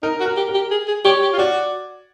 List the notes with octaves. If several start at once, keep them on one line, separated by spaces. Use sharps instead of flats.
D#4 A#4
F#4
A#4
G4
A#4
G4
G#4
G#4
G4 C#5
G4
F4
F#4 D5